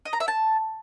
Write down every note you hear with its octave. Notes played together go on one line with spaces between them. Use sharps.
D#5
A#5
E5
A5